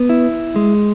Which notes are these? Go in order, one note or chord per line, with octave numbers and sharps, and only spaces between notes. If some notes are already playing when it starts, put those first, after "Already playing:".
Already playing: B3
E4
G#3